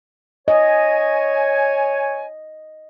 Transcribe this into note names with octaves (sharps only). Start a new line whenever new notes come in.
C#5 D#5 G#5